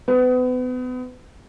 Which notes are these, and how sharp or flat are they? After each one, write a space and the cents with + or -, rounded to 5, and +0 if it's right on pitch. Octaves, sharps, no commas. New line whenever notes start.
B3 +35